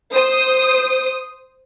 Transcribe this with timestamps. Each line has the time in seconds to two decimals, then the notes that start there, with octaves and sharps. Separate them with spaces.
0.12 C5 D#6